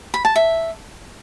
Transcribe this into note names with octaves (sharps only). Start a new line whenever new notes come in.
B5
A5
E5